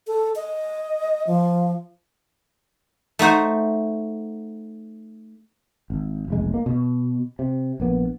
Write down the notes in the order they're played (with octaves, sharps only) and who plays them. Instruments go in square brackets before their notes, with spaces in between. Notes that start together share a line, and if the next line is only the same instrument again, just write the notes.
[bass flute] A4
D#5
F3
[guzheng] A3 D#4 F#4 C5
[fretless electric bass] G#1
F1 B1 G#3
A#3
B2
C3
A#1 A#3 B3